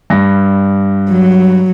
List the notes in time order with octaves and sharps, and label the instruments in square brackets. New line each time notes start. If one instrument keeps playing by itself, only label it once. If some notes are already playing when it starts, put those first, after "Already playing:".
[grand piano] G2 A#6
[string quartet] F#3